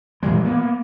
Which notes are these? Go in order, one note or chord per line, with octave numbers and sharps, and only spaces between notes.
A#2 E3 G3 G#3
A#3 B3